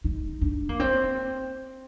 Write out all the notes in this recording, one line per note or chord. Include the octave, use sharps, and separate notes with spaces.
D#4
D4
A#3
C4